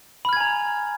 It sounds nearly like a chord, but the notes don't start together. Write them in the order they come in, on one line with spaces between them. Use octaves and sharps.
B5 F6 G#6 G#5 A#5